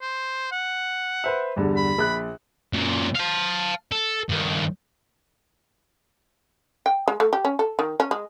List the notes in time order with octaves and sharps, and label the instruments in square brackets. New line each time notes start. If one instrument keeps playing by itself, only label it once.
[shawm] C5
F#5
[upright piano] B4 C5 E5
E2 G2 D3
[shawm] B5
[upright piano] A#1 F#6
[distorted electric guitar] F#2 A#2
F5 A5
A4
G2 D#3
[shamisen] G5
G#3
A3
G4
C#4
A4
D#3
C#4
G#3